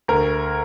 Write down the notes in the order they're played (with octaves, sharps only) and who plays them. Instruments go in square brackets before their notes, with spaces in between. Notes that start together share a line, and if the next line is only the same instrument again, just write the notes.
[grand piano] D2 A#4